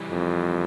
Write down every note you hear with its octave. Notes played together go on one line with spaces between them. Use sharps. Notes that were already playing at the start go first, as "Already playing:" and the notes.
Already playing: E3 G3
F2